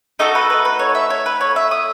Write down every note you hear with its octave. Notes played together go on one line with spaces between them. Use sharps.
A3 D#4 F#4 A4 D#5
B4
B4
B4
C#5
E5
C#5
B4
C#5
E5
D#6